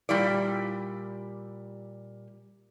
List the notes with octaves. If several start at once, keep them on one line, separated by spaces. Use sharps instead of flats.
A#2 G3 E4 D5